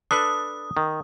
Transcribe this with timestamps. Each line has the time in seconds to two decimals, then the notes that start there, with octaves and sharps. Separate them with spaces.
0.11 D4 A4 B4 D#6
0.77 D#3